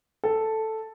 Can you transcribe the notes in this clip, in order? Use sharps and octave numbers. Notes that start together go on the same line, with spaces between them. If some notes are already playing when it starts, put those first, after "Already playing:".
A4